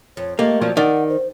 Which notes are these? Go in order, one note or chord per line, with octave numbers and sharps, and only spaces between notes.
F2 C#5
A3 A#3 G4 D#5
F3 F#3 C4 D5
D#3 D5 F#5
C5